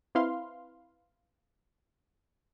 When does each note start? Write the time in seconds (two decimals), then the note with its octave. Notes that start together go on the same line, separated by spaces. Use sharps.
0.15 C4 E4 B4 F5 C6